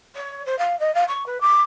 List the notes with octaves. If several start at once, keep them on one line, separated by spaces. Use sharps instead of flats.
C#5
C5
F5
D#5
F5
C#6
B4
D6